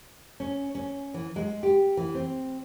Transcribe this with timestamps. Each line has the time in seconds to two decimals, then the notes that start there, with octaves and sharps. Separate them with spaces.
0.40 C#4
0.75 C#4
1.14 E3
1.36 G#3
1.63 G4
1.97 E3
2.15 C4